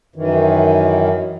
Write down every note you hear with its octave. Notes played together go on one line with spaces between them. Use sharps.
F#2 D#3 E3